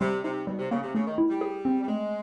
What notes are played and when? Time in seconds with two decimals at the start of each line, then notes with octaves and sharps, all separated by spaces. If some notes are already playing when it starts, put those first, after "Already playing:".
0.01 C3 G3
0.24 C3 D#4
0.47 B2 G3
0.59 C3
0.71 C#3 A#3
0.83 C3
0.95 C#3 A3
1.07 D#3
1.18 E4
1.30 G3
1.41 G#4
1.65 C4
1.82 G3
1.88 G#3 A3